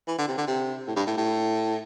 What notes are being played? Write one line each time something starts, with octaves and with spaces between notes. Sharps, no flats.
E3
D3
C3
D3
C3
A2
G2
A2
A2